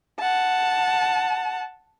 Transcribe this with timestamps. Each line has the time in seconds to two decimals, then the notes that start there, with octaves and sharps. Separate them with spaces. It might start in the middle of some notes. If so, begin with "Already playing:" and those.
0.19 F#5 A5